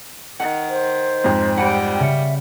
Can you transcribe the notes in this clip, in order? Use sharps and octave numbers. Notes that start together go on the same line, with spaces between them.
D#3 F#5
C5
F2 G#2
G3 F#5 B5
C#3 E5 C#7